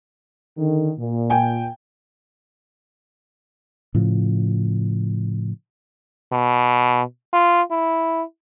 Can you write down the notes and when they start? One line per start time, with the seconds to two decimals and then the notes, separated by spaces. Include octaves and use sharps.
0.57 D3 D#3
0.99 A#2
1.30 G5 G#5
3.95 A2 C#3 F3
6.32 B2
7.33 F4
7.71 E4